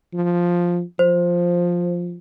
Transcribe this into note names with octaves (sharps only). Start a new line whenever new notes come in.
F3
F3 C5